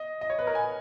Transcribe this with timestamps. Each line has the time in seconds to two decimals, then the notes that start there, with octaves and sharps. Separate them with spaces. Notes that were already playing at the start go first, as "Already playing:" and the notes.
Already playing: D#5
0.21 D#5
0.30 C#5
0.39 B4
0.47 A#4
0.55 G#5